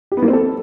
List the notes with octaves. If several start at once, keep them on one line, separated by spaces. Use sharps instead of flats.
G4
B3
A#3
C4
A4